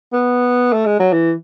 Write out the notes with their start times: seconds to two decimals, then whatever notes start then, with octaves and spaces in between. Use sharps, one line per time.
0.13 B3
0.73 A3
0.86 G#3
0.99 F#3
1.12 E3